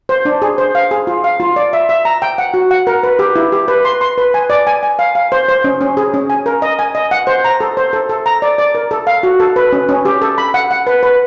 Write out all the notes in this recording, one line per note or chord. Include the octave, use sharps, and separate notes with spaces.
C5
D4
G#4
C5
F5
G#4
F4
F5
F4
D5
E5
E5
A#5
G5
F#5
F#4
F#5
A#4
B4
G4
E4
G4
B4
C6
C6
B4
G#5
D5
G#5
G#5
F5
F5
C5
C5
C#4
C#4
G#4
C#4
G#5
A#4
D#5
G#5
D#5
F#5
C5
A#5
A4
C5
A4
A4
A#5
D5
D5
A#4
A4
F5
F#4
A4
B4
C#4
C#4
G4
A4
B5
F#5
F#5
B4
B4